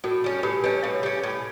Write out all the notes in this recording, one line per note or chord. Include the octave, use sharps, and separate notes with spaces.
A2 F#4
G3 C#4
A2 G4
G3 C#4 B4
A2 C#5
G3 C#4
A2